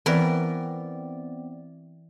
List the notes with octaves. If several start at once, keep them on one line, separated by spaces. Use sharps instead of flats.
E3 B3 C4 A#4 D5